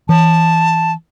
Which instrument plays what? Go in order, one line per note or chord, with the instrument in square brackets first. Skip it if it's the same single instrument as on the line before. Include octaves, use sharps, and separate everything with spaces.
[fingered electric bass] E3 [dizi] A5